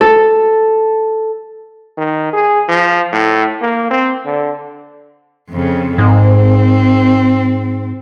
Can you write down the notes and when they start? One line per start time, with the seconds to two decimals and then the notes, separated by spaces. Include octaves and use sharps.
0.01 A4
1.98 D#3
2.33 G#4
2.68 F3
3.12 A2
3.62 A#3
3.91 C4
4.25 D3
5.50 F2 C#3
5.98 G#2 C4